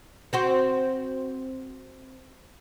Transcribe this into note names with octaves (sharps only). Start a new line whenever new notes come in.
C4 F#4 C5